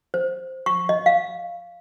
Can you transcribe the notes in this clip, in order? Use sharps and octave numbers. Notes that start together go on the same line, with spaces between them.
C5
C#6
D#5
F5